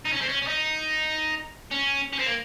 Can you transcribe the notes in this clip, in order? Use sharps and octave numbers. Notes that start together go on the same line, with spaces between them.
D#4
C#4
C4
C#4
C#4
D#4
C#4
C#4
C4
A#3